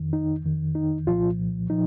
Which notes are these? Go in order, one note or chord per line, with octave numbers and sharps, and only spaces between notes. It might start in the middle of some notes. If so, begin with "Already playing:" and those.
Already playing: F2 D#3
D#4
F2 D#3
D#4
C2 A#2 F3 F4
A#2 F3 D#4